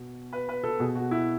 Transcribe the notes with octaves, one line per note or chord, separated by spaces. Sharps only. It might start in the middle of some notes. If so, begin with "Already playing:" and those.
Already playing: B2
B4
B4
A4
B2 G#4
F#4
E4